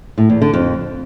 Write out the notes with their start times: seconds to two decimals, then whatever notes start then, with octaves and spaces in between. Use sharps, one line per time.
0.18 A2
0.30 E2
0.42 D3
0.53 F2